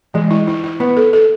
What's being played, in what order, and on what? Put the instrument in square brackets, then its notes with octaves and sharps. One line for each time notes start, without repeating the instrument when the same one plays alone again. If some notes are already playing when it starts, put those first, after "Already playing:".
[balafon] E3 [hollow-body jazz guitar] G#3
[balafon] E4
E4
E4
[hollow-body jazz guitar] B3 [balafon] E4
[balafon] A4
A4